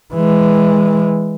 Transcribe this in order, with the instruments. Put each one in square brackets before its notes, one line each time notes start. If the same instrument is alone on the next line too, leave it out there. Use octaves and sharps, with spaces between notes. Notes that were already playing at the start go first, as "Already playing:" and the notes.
[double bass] E3 G#3